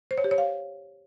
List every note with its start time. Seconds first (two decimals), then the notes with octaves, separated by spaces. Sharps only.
0.11 C5
0.18 C#5
0.24 G4
0.31 C#5
0.38 F5